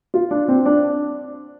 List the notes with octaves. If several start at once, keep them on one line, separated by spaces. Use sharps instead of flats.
F4
D4
C4
D4